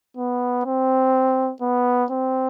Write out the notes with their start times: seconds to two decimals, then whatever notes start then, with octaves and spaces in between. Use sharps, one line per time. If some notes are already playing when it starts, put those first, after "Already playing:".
0.17 B3
0.65 C4
1.62 B3
2.10 C4